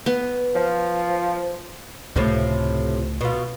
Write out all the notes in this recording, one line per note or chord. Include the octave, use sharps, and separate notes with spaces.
B3
F3
C#2 A2 C3 F3 A3
B2 F4